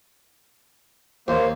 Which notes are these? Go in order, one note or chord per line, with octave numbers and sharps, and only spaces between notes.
D#2 A#3 C5